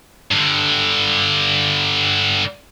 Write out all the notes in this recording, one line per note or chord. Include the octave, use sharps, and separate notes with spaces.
G2 D3